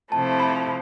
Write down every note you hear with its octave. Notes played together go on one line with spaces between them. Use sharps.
C3 F3 A3 E4 A5
B5